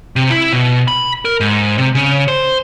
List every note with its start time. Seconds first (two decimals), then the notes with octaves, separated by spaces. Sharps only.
0.16 C3
0.30 E4
0.53 B2
0.88 B5
1.25 A#4
1.40 G#2
1.78 C3
1.95 C#3
2.28 C5